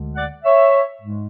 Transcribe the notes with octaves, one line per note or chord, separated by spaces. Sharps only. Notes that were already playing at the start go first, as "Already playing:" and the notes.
Already playing: D2 D3 G#3
D5 F#5
C#5 E5
G#2 G#3